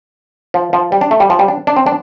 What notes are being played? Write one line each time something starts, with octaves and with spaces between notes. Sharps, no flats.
F3
F3
G3
D4
A3
G3
F3
G3
D4
D4
C4
D4